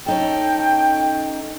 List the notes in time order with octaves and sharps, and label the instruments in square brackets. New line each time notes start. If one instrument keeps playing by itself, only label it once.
[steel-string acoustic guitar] C#4 D#4 A4 [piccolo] G5